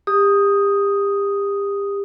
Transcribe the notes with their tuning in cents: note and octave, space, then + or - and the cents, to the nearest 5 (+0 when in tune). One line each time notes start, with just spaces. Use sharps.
G4 +35 D#6 +0